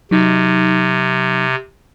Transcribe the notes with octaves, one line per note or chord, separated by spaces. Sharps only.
C3 F#3 D#4